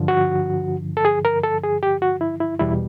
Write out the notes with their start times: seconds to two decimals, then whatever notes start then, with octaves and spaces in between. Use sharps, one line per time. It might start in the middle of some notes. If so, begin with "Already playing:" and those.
Already playing: G2 D3 F3
0.08 F#4
0.97 A4
1.05 G#4
1.25 A#4
1.43 A4
1.63 G#4
1.83 G4
2.02 F#4
2.21 E4
2.40 E4
2.59 E2 B2 G3 E4